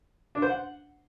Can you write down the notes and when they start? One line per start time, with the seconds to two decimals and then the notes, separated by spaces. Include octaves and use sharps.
0.35 D4
0.42 C5
0.50 F#5